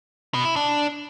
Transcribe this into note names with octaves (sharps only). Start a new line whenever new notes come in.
B2
E4
D4